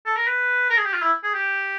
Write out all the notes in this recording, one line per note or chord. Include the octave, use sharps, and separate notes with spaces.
A4
A#4
B4
A#4
G#4
G4
F4
E4
G#4
G4